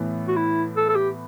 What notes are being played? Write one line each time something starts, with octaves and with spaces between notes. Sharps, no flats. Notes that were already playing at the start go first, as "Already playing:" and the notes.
Already playing: A2 E3 B3
F#4
E4
A4
A4
G4